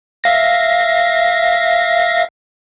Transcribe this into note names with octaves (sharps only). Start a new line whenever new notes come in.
E5 F5 A#6